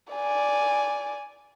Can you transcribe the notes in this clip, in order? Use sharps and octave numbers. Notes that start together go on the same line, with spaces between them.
D5 G#5